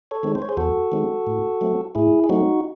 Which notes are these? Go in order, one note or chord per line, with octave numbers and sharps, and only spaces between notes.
A4 C#5
D#3 G#3 C4
C5
C#5
G#4 C5
E2 F#4 A4
D#3 G#3 C4
A2
F#3 A3 C4
A2 E4 G#4
G#4
F#3 A3 C4 D#4 F#4